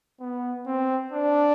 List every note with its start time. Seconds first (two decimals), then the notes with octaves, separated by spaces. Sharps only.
0.20 B3
0.66 C4
1.12 D4